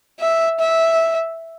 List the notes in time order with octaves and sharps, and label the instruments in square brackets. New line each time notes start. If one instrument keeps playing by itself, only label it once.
[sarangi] E5
E5